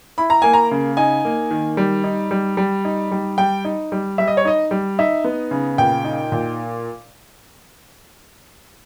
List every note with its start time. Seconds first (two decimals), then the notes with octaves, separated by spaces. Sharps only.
0.18 E4 B5
0.30 A#5
0.42 A#3 G#5
0.53 A#5
0.71 C#3
0.97 D#4 G#5
1.25 A#3
1.51 D#3
1.77 G3
2.04 D#4
2.31 G3
2.57 G3
2.85 D#4
3.11 G3
3.38 G3 G5
3.65 D#4
3.92 G3
4.18 G3 E5
4.27 D#5
4.37 C#5
4.45 D#4 D#5
4.71 G3
4.99 D#4 E5
5.24 B3
5.51 C#3
5.78 A#2 G5
6.05 D#4
6.32 A#2